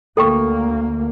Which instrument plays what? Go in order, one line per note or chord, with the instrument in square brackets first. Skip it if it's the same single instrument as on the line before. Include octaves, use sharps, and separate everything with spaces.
[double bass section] D2 A#3 [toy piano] A4 G5 C#6